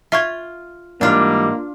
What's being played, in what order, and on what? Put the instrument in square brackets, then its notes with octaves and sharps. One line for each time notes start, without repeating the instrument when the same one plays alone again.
[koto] F4 [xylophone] E5 C#6 G#6
[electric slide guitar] G#2 E3 G3 [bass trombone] A#3 [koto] D4 F4